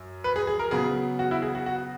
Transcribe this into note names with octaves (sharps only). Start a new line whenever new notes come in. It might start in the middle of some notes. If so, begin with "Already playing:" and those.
Already playing: F#2
B4
G#4
G#4
A#4
C#3 F#3 B3 G#4
F#4
E4
G#4
F#4
F#4